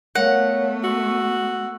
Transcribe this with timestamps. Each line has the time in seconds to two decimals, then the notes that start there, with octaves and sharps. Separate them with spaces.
0.15 A3 B3 A#4 C#5 F5 F#5
0.84 F#4 E6